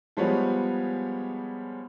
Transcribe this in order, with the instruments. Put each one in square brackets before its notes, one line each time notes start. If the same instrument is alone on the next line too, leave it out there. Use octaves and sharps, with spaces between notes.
[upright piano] F3 G3 G#3 B3 C#5